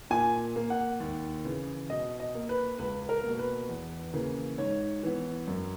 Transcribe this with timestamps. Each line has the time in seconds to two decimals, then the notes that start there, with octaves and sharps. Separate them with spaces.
0.10 A#2 G#5
0.56 A#3
0.70 F#5
1.00 D#2
1.45 C#3 E3
1.90 B2 D#5
2.20 D#5
2.35 A#3
2.49 B4
2.79 C#2 B4
3.09 A#4
3.24 B2 A#3
3.39 B4
3.69 E2
4.13 C#3 E3 A#3
4.58 G#2 C#5
5.03 E3 B3
5.47 F#2